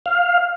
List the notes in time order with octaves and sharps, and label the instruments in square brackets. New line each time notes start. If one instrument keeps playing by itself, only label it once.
[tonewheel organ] F5